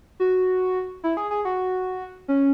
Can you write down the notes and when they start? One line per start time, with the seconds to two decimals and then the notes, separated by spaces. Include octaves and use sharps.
0.20 F#4
1.04 E4
1.17 G#4
1.31 G#4
1.45 F#4
2.28 C#4